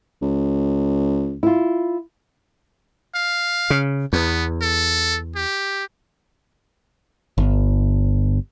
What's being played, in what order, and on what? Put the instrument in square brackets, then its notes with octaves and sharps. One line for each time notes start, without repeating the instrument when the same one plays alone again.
[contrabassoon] C#2
[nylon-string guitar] E4 F4
[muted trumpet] F5
[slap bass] C#3
[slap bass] E2 [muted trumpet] B3
[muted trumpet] A4
G4
[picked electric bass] G1